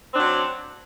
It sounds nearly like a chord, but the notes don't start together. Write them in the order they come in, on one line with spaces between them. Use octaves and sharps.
C4 D4 F#3